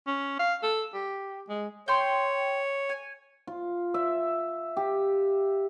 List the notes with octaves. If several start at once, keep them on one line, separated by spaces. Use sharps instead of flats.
C#4
F5
A4
G4
G#3
C#5 G5 C6
G#5
F4
E5
G4